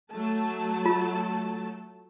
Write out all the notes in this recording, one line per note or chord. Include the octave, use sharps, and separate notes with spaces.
F#3 A3 A5
F4